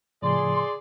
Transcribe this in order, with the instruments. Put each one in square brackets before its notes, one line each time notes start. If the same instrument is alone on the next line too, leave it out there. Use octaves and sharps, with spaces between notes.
[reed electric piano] A2 C#3 F3 [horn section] G#4 D5 [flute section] C6